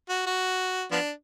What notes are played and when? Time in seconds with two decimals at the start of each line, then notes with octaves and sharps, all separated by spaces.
0.09 F#4
0.26 F#4
0.91 F3 B3 D4